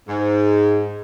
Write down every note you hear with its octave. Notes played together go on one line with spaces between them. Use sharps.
G#2